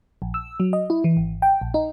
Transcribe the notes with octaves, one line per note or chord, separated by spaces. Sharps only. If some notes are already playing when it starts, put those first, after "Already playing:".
A#1
E6
F#3
D#5
E4
E3
G#1
G5
A#1
D#4